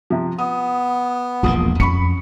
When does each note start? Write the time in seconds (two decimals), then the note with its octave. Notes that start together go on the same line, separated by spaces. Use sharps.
0.10 C3 F3
0.39 B3 D#6
1.43 E1 A#1 E2 F3 A#3 D#6
1.80 F2 C#4 B5 C#6 C#7